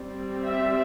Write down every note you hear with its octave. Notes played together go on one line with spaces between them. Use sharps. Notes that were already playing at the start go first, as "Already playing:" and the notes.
Already playing: G3 C4
E5